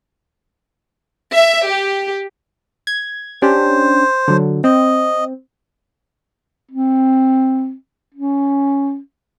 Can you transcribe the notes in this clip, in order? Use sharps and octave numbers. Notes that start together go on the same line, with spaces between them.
E5
G4
G#6
C#4 D4 G4 C5
D3 F#3
C4 D#5
C4
C#4